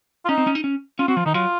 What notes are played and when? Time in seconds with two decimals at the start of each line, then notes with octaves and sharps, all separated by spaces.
0.25 F4
0.29 C#4 D#4
0.38 C4
0.47 C#4
0.55 D#4
0.64 C#4
0.99 C#4 F4
1.08 C4 F#4
1.16 F3 F4
1.26 D#3 D#4
1.34 F#3 F4